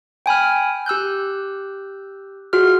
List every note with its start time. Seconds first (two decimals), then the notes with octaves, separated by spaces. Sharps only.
0.26 G5 G#5 B5 F6
0.86 G4 E6 F#6 G6
2.53 F4 F#4 G#4 F6